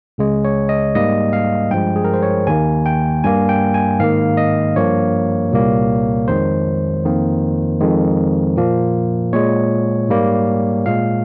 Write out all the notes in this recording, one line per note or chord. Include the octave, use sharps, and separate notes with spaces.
C#2 C#3 G#3
C#5
D#5
G#2 G3 A#3 D#5
F5
G2 F3 G#3 G5
G#4
A#4
C5
C#5
D#2 D#3 A#3 G#5
G5
G2 G3 A#3 G#5
G5
G#5
G#2 D#3 A#3 F5
D#5
G2 F3 A#3 C#5
C2 A#2 G3 A#3
F2 D#3 G#3 C5
F2 D#3 A#3
F2 D#3 G#3
A#2 F3 A#3
A#2 G#3 C#5
G#2 G3 A#3
A#2 G#3 F5